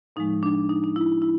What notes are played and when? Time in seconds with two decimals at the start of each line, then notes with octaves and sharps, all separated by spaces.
0.16 A2 F3 G#3 D#4
0.43 D4
0.69 D#4
0.84 D#4
0.96 E4
1.22 E4